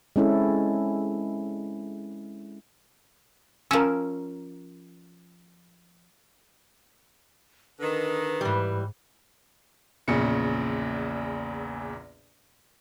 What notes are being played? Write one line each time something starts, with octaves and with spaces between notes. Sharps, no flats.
G#3 C4 C#4 E4 A4
F3 C#4 A#4 E6
D3 D#3 B4
G#2 E3 G3
A#1 E2 A#2 C#3 C#7